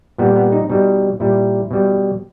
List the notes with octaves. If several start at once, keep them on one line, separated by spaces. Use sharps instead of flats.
A#2 G3 B3
B3
D#4
B2 G3 D#4
A#2 G3 E4
B2 G3